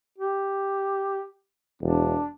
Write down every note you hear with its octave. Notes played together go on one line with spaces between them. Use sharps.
G4
E1 D4